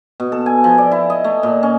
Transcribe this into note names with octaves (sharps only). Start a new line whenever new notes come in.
B2
A4
G#5
F3
D5
E4
D#5
A3
A#2
C#4